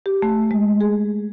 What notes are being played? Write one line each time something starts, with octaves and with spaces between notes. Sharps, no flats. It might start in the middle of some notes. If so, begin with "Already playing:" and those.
G4
A3
G#3
G#4